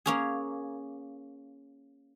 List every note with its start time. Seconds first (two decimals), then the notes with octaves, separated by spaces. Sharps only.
0.06 A#3 C#4 G#4